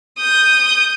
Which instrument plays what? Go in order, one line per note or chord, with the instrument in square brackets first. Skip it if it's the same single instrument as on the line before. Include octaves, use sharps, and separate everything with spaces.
[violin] D#6 G6